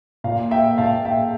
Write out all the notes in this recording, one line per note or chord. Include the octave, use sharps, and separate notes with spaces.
A#2 F5
E5 G5
A#2 F5 A5
E5 G5